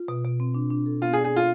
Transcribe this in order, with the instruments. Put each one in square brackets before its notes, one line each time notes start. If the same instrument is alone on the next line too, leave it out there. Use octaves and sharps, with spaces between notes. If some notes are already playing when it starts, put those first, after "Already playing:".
Already playing: [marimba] F4
B2
B2
C4
D4
D4
A4
[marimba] B3 [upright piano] F4
[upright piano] G#4
[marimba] D5
[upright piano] G#4
[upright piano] F4 [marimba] A4